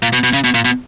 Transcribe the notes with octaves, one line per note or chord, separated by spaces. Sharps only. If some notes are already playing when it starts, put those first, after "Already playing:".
A#2
B2
B2
C#3
B2
A#2
B2